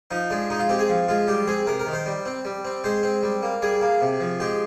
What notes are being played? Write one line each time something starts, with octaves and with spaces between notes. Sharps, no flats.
F3 D#4
G#3 D4
G#3 D#4
F4
C4 G4
G#4
F3
G#3 F4
G3 G4
C4 G#4
C3 A#4
A#4
D#3
C5
G3
C4
G3
C4
G#3 C5
C4
G3
A#3
G3 G#4
A#3
C3
F3
G#3 G4